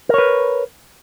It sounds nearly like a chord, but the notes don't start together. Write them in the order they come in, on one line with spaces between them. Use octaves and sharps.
A#4 C#5 B4